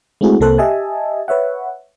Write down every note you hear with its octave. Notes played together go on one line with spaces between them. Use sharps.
G#3 A3 C4 E4 F#4 G#4
C2 C3 A#3 A4 C5 F#6
G4 D#5 E5 G#5 A5
B4 C#5 E5 F#5